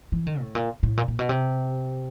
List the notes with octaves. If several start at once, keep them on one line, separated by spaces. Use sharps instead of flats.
E3
D#3
A2
A#2
A2
A#2
A#2
B2
C3